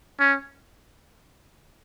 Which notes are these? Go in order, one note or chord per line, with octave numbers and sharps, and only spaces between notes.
C#4